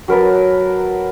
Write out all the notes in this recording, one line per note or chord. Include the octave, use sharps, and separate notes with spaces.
F#3 A#4 B4 A5